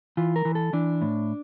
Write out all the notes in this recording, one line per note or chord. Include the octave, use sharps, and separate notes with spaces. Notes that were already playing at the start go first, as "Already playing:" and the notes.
E3 F4
A#4
E3
A4
E3 D4
A2